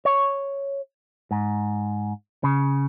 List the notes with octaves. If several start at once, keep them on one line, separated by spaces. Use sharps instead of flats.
C#5
G#2
C#3